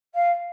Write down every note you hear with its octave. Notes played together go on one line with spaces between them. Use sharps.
F5